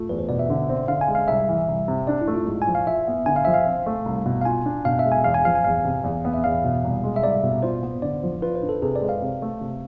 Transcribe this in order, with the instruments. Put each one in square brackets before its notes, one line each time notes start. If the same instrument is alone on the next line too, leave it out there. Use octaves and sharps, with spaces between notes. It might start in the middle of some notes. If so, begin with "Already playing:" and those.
Already playing: [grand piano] A3 [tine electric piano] F4
[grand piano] E2 [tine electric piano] B4
[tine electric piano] C5
[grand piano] B2 [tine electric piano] D5
[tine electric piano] E5
[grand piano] D3
C4
[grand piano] D3 [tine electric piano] F5
[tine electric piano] G#5
[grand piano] G#3
[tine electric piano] F5
[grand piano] C2 [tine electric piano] E5
[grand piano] E3
C2
C3
[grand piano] D4 [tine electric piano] D5
[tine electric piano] E4
[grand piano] A3
[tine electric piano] F4
[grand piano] G#2
[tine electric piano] G#5
[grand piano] F3
[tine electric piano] F5
[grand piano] F4 [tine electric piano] E5
[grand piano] B3
[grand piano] D3 [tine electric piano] G#5
[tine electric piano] F5
[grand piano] F3 [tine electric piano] E5
[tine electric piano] F5
[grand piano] C4
A3
C2
B2
[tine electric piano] F5
[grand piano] F4 [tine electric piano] G#5
[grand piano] D4
[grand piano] B2 [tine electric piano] F5
[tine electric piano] E5
[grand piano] G#3
[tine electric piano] G#5
[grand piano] E2 [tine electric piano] F5
[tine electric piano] G#5
[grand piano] F3 [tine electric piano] F5
[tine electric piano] G#5
[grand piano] E2 [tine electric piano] F5
[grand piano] C3
E2
B3
[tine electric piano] E5
[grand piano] E2 [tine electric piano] F5
[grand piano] B2
C2
G#3
[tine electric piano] E5
[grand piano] C2 [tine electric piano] D5
[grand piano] B2
[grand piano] F4 [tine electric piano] C5
[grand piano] B3
[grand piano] D3 [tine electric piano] D5
[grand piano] F3
[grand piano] F4 [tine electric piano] B4
[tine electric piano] C5
[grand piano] D4
[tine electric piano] A4
[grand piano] C3 [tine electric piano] G#4
[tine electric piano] D5
[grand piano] G#3
[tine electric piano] F5
[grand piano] C3
A3
C3